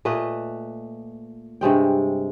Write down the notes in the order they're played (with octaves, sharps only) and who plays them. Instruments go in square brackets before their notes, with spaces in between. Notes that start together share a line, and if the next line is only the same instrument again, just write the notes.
[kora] A#2 A3 B4 D#5
G2 C3 G#3 G5